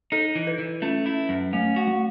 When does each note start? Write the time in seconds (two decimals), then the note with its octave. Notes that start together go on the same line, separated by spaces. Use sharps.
0.12 D#4 A4
0.35 E3
0.47 B4
0.59 E3
0.82 A3 C#4
1.06 E4
1.29 F#2
1.53 A3 C#4
1.76 F#4
1.87 A3